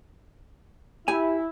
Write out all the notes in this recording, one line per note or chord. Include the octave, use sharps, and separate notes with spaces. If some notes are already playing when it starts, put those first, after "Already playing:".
E4 G4 G#5